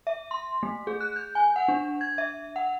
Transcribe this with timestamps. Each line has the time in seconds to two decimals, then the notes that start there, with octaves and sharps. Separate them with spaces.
0.07 E5
0.31 C6
0.63 A3
0.87 G#4
1.00 F#6
1.16 G6
1.35 G#5
1.56 F#5
1.68 D4
2.01 G#6
2.18 E5
2.56 F#5